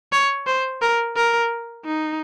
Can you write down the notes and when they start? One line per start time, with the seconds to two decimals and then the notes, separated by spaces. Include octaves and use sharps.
0.13 C#5
0.47 C5
0.82 A#4
1.16 A#4
1.85 D#4